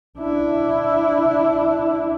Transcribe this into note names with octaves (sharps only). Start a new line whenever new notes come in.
D4 E4